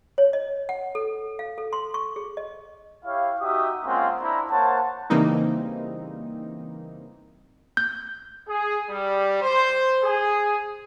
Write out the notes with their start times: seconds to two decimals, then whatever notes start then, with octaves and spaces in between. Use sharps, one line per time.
0.18 C#5
0.33 D#5
0.69 F#5
0.95 A4
1.39 F5
1.58 A4
1.73 C6
1.94 C#6
2.16 G#4
2.37 D#5
3.05 E4 G4 C#5 F5
3.40 D#4 F#4 G4 E5 D#6
3.85 G#3 A#3 C4 C#4 F4 F#5
4.21 D4 E4 C5 A#5
4.50 A#3 C5 C#5 F#5 A5
5.10 C#3 E3 G3 A#3 C4 D#4
7.77 G6
8.48 G#4
8.90 G3
9.42 C5
10.03 G#4